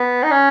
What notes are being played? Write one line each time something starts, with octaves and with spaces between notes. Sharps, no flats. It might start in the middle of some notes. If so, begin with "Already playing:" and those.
Already playing: B3
D#4
C#4